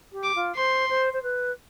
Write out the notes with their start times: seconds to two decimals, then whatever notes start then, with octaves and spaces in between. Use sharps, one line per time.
0.13 G4
0.24 D6
0.35 F4
0.56 C5 C6
0.89 C5
1.13 C5
1.23 B4